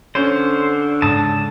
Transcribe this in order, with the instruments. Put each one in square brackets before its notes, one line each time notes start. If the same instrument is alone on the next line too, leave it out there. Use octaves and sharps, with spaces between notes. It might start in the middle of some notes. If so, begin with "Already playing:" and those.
[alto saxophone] D3 [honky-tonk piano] C#4 [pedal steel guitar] C5
[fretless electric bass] G#2 C#3 [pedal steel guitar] A5 D#6